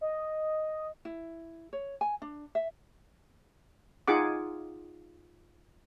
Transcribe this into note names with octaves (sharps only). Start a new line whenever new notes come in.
D#5
E4
C#5
G#5
D4
E5
D#4 F4 G#4 F#5 D6